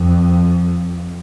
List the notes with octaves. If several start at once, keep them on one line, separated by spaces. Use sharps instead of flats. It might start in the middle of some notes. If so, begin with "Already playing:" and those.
Already playing: F2